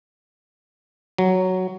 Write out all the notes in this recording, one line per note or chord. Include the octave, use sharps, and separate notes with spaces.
F#3